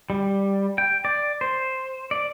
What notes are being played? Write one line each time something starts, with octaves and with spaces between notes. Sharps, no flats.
G3
G5
D5
C5
D5